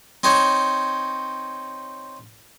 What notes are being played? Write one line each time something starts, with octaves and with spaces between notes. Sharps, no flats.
C4 D#4 C5 C#5